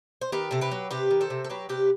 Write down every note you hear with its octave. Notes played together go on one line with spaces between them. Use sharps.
C5
D#3 G4 B4
C3 A4
G4 B4
F#3
C3 G4 B4
D#3
A4 C5
C3
A4
F#3 G4 B4
C3 G4 B4